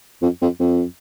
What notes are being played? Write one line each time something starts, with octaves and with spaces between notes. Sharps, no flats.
F2
F2
F2